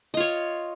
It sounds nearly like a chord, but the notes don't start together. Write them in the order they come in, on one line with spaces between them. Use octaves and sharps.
D#5 F4 C#5